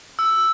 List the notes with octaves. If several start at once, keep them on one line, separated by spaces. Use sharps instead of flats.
E6